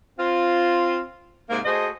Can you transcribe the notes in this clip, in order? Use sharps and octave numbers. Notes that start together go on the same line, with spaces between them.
C4 F4
G#2 C3 A#3
A3 F#4 G#4 C5 D#5